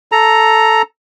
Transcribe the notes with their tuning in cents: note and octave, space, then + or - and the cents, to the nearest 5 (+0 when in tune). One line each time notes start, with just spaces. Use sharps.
A4 +0 A#5 +0